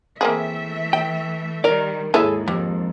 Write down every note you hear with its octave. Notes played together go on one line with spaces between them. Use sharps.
E3 A3 A#3 C4 G#4 E5
G5
D#3 G3 A#4 D5
D#2 G#2 E4 G#4 A4 C#5 E5 G#5
F2 G4